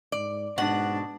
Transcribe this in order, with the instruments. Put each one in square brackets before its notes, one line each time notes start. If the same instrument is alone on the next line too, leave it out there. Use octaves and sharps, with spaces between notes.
[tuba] G#2 [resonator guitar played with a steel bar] D5
[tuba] G#2 [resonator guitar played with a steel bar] B2 [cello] D4 [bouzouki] F#5